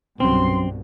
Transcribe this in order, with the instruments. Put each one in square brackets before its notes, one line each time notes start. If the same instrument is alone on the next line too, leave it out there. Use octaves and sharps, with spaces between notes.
[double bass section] C2 G2 B2 [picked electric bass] F#3 C#4 [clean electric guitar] C4 [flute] C6